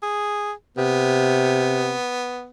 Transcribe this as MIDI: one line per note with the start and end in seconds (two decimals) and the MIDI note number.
0.02 0.52 68
0.77 1.95 48
0.77 2.49 59